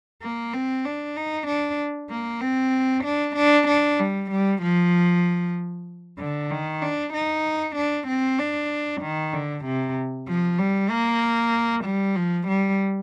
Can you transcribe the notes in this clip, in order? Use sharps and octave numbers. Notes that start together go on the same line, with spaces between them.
A#3
C4
D4
D#4
D4
A#3
C4
D4
D4
D4
G3
G3
F3
D3
D#3
D4
D#4
D4
C4
D4
D#3
D3
C3
F3
G3
A#3
G3
F3
G3